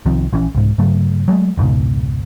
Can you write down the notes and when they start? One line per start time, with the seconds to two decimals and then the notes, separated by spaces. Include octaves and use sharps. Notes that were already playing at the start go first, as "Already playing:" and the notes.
0.06 C2 D#3 F3 C4
0.33 A#1 E3 C#4
0.55 C2 G#2
0.78 G2 C#3 F#3 A3
1.28 F#3 G#3 A3
1.57 F1 C#2 G#2 B2